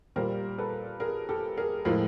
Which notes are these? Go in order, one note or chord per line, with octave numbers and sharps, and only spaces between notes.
A#2 G3 A#4 C5
A4 B4
G#4 A#4
G4 A4
G#4 A#4
A2 F3 G#3 G#4 A#4